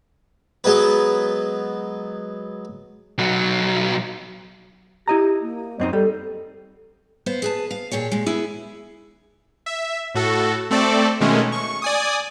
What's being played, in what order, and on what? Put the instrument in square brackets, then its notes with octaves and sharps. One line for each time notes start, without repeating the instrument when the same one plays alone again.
[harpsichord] F#3 G#3 B3 B4
[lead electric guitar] B1 F#3
[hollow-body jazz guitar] E4 D#5 A#5 [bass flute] G4
[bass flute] A#3
[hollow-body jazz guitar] F#2 C4 D#4 [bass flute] D#5
[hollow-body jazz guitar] G3 [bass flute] A4
[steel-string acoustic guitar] B3 C5 F5
G#4 B4 A5
F5
A#2 G4 G#4 C#5
A#2 G#3
B3 E4 G#4
[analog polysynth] E5
A2 F#4 A4
A3 C4 A4 D5
B2 D#3 G#3 A3 C#4
C#6
D5 G#5 D#6